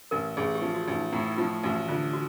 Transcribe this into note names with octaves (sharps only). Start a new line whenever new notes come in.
A1 A#4
A1 G#4
G4
F3
F#4
A1
D#4
A2 E4
F3 F4
A1 F#4
D3 F4
F#4